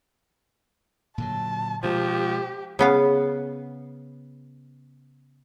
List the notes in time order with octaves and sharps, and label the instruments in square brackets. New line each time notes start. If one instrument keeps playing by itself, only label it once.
[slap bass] A#2 D3 F#3 [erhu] A5
[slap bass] B2 G#3 [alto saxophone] F3 [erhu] G4
[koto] C#3 B3 F5